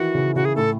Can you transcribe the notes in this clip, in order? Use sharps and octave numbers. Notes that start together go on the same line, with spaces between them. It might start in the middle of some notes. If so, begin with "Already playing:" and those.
Already playing: D#3 E3 F#4
C#3
C#3 F#4
G#4
A2 A4